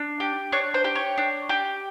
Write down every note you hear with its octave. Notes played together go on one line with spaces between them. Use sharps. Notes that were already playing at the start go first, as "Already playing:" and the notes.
Already playing: D4
G4
D4 C#5
C5
G4
C#5
D4
G4